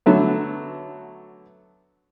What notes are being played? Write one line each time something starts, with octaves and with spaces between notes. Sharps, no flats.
D3 F#3 A3 B3